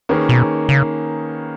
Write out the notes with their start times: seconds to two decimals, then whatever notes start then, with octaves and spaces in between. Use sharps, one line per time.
0.09 D#3 A#3 C#4 G#4 B4
0.29 B2
0.69 C#3